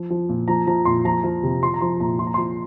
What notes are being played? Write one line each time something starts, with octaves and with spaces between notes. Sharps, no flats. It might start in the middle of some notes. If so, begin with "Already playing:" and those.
Already playing: F3
F3
A#2
F3 A#5
F3 A#5
A#2 C6
F3 A#5
F3
C3
F3 C6
A#5
F3 C6
A#2 A#5
F3 C6
A#5
F3 C6